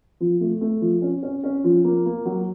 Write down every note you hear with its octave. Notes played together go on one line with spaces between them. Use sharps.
F3
A3
A3
F3
C#4
C#4
C#4
F3
A#3
A#3
F#3